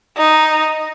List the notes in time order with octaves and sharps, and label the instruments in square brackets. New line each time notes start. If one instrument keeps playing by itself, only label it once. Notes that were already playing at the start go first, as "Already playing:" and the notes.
[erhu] D#4